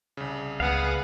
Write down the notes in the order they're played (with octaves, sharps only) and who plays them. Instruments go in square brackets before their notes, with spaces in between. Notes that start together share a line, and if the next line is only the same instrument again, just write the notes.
[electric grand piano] C2 C#3
[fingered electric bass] C#2 [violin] B3 G#4 [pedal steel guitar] F5 F#5